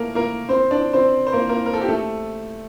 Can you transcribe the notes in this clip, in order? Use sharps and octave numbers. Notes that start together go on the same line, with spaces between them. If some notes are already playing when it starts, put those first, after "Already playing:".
Already playing: A3 A#3 A#4
A#3 A#4
C4 C5
D4 D5
C4 C5
C5
A#3 A#4
A#3 A#4
A#4
A4
G4
A3 A4